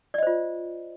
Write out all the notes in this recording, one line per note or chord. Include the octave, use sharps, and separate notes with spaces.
F4 C5 D5 D#5